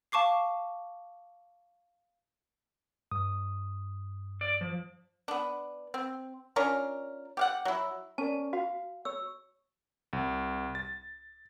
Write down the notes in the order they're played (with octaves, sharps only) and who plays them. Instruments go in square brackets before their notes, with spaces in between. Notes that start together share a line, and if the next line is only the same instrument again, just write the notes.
[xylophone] F5 A5 C#6 D6 C7
[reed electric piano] G2 D#6
[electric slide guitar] D5
F3
[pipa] B3 D4
C4
C#4 D4 F4 A#4
G4 F5 F#5
F#3 E4
[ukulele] C#4 A#4 D5 [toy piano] A5
[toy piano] F#4 [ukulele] F5
[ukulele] C#5 [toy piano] E6
[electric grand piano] C2
A6